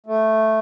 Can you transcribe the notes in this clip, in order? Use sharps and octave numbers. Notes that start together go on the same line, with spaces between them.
A3